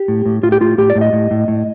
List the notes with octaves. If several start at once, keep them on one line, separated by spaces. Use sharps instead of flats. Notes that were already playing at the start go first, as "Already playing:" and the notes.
Already playing: G4
A2
A2
A2 F4
G4
A2 F4
A2 G4
D5
A2
D#5
A2
A2
A2